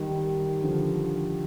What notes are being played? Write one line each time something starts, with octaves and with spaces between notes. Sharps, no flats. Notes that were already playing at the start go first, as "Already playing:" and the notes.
Already playing: D#3 G3
D3 F3